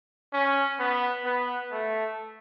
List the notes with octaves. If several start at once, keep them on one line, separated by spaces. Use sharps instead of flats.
C#4
B3
B3
A3